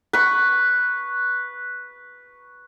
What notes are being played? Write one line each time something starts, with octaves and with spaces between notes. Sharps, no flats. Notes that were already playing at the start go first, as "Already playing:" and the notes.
B4 C#6